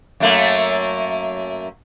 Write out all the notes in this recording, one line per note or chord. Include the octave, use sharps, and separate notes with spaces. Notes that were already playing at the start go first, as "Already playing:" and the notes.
F#2 A3 A#3